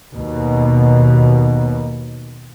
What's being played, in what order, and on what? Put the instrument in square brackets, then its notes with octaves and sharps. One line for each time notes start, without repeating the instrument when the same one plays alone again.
[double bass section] D#2 B2